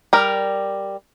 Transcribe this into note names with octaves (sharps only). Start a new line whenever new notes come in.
G3 A#4